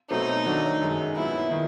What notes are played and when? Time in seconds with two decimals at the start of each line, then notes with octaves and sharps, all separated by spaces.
0.10 B2 F#3 A3 C4 D#4
0.46 D#3 F#3 A3 D4
0.82 F#2 D#3 G#3
1.16 A#2 F#3 B3 E4
1.51 D#3